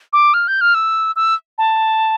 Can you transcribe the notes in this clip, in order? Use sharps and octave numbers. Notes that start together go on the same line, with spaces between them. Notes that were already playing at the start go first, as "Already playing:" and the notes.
D6
F6
G6
F6
E6
E6
A5